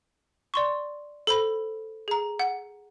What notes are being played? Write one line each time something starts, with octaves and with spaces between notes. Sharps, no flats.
D5 C6 C#6
A4 C5 B5
G#4 A#5
F#5